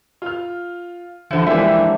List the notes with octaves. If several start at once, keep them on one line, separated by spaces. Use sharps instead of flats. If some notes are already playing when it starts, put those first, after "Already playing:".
F4 F6
D3 E3 F3 C5 F#5
E3 G3 G#3 A#3 G4 D5 E5
D4